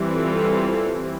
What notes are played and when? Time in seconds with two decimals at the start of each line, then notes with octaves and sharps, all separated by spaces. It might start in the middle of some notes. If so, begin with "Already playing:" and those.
Already playing: E3 G3 C4
0.13 F4 A4